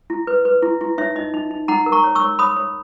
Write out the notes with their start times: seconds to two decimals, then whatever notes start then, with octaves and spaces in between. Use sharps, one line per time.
0.10 E4
0.27 B4
0.45 B4
0.63 E4
0.81 E4
0.98 D#4 C#5 E5
1.16 D#4 D#5
1.34 D#4
1.51 D#4
1.68 D#4 F#5 A#5
1.86 A#4
1.92 A#5 C#6
2.04 C#5
2.15 C#6 E6
2.21 C#5
2.39 C#5 B5 D#6
2.57 C#5